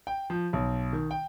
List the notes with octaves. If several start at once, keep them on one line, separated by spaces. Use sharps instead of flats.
G5
F3
B1
D#3
G5